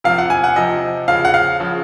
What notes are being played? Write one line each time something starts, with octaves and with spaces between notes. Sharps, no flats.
C3 F3 F5
F#5
G#5
F#5
C3 F3 D#5
C#3 F3 F5
F#5
F5
C#3 F3